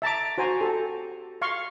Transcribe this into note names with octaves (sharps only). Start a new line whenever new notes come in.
E5 A5 A#5 D6
F#4 C5 G#5 A#5
G4 A4
F5 C6 C#6